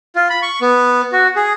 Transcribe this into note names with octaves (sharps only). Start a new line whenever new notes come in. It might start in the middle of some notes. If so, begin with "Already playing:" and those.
F4
B5
C#6
B3
F#4
G#4